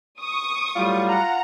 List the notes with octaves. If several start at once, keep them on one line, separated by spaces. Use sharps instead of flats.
C#6 D#6
A2 F#3 G3 F4
F#5 A#5